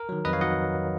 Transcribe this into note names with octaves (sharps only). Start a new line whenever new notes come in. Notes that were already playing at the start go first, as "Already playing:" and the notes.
Already playing: A#4
D#3 F#3
F2 B4 D#5
C#5 F5
D#3 F#3 D#5 F#5